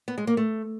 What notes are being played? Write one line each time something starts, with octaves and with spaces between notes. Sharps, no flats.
B3
G#3
A#3
A3